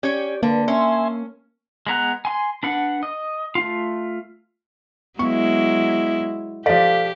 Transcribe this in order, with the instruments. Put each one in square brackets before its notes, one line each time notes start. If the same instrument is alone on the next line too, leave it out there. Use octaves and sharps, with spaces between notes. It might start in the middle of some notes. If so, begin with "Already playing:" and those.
[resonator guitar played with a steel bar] C#4 C#5 [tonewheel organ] G4 D5
[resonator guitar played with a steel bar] D3 [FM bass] A#3 [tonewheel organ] B4
[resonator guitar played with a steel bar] C#4 [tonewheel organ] E5 G#5 C6
[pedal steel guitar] G#3 B3 A#5 F#6
G#5 C6
D4 B4 F#5
D#5
A3 F4
[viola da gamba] F#3 G#3 E4 [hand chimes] B3 [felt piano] C#6
[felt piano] F3 D5 [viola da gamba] G4 [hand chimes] A4 F5 B6